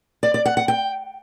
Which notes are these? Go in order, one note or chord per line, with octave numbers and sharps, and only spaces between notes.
D5
D5
F#5
F#5
G5